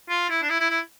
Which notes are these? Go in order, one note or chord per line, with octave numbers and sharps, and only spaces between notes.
F4
E4
D4
E4
E4
E4